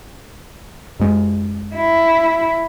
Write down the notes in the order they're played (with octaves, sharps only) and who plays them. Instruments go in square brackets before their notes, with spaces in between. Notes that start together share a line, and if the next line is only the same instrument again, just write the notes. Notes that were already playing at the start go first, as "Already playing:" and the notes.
[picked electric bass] F#2 G#3
[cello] E4